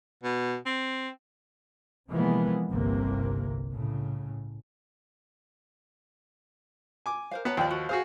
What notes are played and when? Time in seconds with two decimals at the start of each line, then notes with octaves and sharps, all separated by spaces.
0.23 B2
0.66 C4
2.10 C3 E3 F3 G#3 A#3 B3
2.71 G1 C2 C3 A#3
3.72 A2 C#3
7.06 G#5 D6
7.31 A#4 C5 F5
7.45 B3 C#5 A5 A#5
7.57 D#2 F3 D5 G5
7.70 F#4
7.89 F#4 G#4 C5 F5